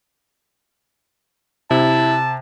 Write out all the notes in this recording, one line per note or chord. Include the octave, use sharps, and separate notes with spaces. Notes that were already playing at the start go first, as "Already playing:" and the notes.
C3 E4 A5